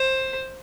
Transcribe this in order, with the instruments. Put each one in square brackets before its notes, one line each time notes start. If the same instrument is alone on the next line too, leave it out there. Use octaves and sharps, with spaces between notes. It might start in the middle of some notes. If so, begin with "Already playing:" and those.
Already playing: [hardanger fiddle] C5